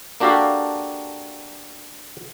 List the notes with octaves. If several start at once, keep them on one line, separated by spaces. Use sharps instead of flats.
A#3 D4 F#4 G4 A4 F5